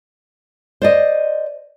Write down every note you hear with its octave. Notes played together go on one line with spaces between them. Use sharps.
C5 D5 D#5